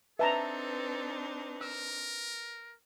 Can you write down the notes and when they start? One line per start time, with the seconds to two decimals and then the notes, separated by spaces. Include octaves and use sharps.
0.19 C4 D4 D#4 A4 B4 E5 A5 A#5
1.61 A#4 E6